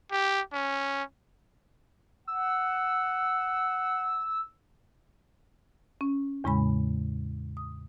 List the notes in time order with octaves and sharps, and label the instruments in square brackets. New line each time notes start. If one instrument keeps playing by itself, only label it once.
[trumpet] G4
C#4
[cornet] F#5 [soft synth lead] E6
[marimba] C#4
E2 A2 C#3 G#3 B5
D#6